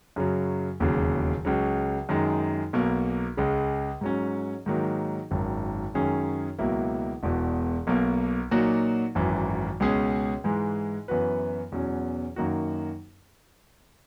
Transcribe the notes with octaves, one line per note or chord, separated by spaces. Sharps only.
F#2 C#3 F#3
E1 D#2 C#3 F#3
C#2 C#3 F#3
F#2 D#3 G#3 D#4
B1 B2 A#3
C#2 C#3 G#3
G#2 F#3 C#4
G#2 D#3 F#3 A#3 D#4
G#1 F#2 D#3
F#2 D#3 G#3 C#4 G#4
C#2 B2 F#3 A#3 E4
E1 E2 B2
B1 B2 A#3
A#2 F#3 A#3 D#4 F#4
G#1 F#2 E3
C#2 B2 G#3 C#4 G#4
G#2 E3 G#3
F#2 E3 B3 F#4 B4
E2 B2 F#3 C#4
F#2 D#3 A#3 D#4 F#4